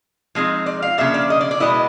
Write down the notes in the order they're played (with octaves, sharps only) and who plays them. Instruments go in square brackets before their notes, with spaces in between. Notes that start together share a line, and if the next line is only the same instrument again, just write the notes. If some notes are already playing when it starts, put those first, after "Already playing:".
[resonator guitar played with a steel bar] F3 G#3 C4 D#4
D5
F5
C#3 F3 A#3 D4 E5
D5
D#5
D5
D5
B2 G#3 B3 E4 D#5